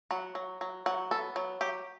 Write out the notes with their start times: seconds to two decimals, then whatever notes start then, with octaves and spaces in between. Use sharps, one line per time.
0.11 F#3 F#5
0.35 F#3
0.61 F#3
0.86 F#3 F#5
1.11 B3 A4
1.36 F#3
1.61 F#3 G4